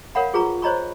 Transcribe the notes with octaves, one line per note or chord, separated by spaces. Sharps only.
A#4 C#5 F5 F#5 B5
F4 G#4 B4 A#5 C#6
C5 C#5 D#5 A#5 B5 C#6